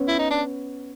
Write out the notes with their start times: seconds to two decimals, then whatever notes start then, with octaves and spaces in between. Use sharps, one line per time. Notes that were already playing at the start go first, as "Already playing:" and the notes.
Already playing: B3 C#4
0.08 E4
0.19 D#4
0.31 D4